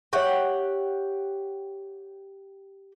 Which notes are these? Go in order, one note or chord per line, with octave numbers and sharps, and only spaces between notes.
G4 C#5 E5 F#5 C#6